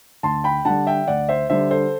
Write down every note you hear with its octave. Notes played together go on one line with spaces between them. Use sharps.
D2 A5 C6
G5 B5
D3 G3 F#5 A5
E5 G5
D2 D5 F#5
C5 E5
D3 G3 C5 E5
A4 C5